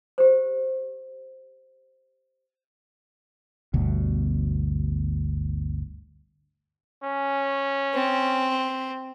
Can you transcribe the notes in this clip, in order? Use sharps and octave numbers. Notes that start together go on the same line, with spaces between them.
G4 C5
G1 D2 B2
C#4
C4